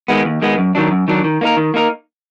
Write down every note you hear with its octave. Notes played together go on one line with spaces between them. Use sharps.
D#3 G#3 B3
D#2
D#3 G#3 B3
F#2
D#3 F#3 D4
F#2
D#3 F#3 D4
D#3
A#3 D#4 A#4
D#3
A#3 D#4 A#4